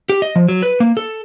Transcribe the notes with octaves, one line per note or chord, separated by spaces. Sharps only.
G4
D#5
F3
F#3
B4
A#3
A4